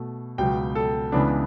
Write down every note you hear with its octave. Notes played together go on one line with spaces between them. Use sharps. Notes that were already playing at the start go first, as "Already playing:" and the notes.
Already playing: B2 A3
C#2 B2 F#3 B3 G5
A4
C#2 C#3 E3 B3 D4